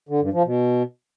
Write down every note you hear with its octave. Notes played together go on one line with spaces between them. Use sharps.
D3
G2
F3
B2